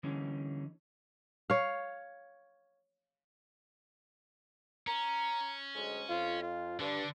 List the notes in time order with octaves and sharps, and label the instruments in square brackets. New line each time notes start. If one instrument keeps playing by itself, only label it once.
[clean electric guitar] D3 E3 G3 A#3 C#4 D#4
[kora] C#5 F5
[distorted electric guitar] C#4 [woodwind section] A#5
[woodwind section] D2 F#3 G#3
[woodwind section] F2 [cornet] F4
[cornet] F4
[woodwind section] G2 [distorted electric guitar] D3 [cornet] D4